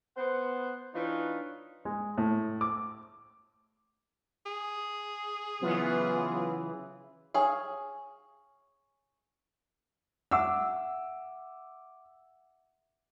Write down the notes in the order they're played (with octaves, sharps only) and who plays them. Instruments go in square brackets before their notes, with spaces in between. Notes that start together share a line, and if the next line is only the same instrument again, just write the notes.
[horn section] B3 C5 F#5
E3 D4 D#4 F4 B4 C#5
[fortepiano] G#3
A2
D6
[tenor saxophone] G#4
[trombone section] C#3 E3 [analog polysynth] F#3 B3 F4
[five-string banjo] G#4 C#5 F5
[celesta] E5 F#5 [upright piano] D6 E6